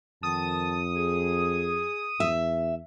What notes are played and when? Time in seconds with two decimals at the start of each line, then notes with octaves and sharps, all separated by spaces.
0.23 F2 D#3 A5 D#6
0.96 G#4
2.20 E2 E5